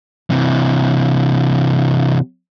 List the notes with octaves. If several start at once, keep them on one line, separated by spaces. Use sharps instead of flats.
C3 E3